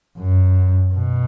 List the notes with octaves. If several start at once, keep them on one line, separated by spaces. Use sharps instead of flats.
F#2
B2